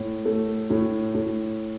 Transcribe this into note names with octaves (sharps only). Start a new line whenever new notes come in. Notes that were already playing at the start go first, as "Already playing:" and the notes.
Already playing: A2
A3
A2
A2